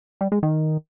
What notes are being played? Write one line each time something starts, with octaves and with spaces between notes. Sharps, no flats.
G3
G#3
D#3